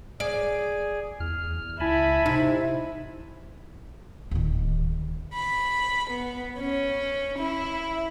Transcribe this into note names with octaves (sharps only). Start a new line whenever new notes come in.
G#4 D5
E2 F6
C#2 E4 G#5 A5 B5
C3 D#4
D1 D#3
B5
B3
C#4
E4